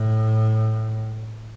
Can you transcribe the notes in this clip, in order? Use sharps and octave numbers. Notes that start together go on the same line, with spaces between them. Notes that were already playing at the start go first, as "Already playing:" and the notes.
Already playing: A2